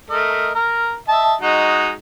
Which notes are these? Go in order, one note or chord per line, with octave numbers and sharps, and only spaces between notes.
A3 A#4 D#5
A#4 A#5
D#5 E5 A5
G#3 D#4 F#4